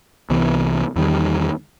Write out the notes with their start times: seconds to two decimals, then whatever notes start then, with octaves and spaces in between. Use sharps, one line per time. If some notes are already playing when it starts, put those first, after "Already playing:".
0.30 C2 C3 E3 B3
0.96 E2 D#3 G3